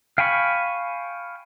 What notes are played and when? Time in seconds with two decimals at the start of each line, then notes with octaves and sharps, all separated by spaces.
0.18 F5 G5 G#5 B5 C#6